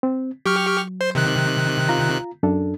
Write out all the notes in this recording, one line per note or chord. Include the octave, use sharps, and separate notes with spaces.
C4
F#3 G4 C#6 F6
C5
C3 D#3 F#6
F4 A#5
F#2 D4 A4